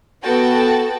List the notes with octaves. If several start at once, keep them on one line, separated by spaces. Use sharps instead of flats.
B3 F#4 A4 G5 A5